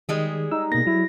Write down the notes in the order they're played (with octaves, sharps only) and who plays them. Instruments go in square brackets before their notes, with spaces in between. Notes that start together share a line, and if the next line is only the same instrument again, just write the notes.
[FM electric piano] D#3 [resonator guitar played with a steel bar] G3 G#3 G#4
[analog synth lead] D#4 [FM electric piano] E6
[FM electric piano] B2 A#3 [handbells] A#6
[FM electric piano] F#3 [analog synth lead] E4